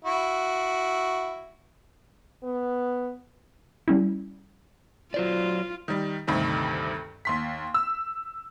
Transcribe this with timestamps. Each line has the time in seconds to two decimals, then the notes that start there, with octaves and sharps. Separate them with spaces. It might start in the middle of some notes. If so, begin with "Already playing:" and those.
0.05 E4 F#4
2.44 B3
3.88 G3 C#4 E4
5.14 F#3 F4 C5 D5
5.88 D#3 G3
6.27 D2 G2 C3 D#3 A3
7.25 D#2 C6 B6
7.74 E6